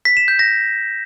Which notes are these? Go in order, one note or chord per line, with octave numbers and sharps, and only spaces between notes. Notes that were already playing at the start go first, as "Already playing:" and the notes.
B6
E7
G6
A#6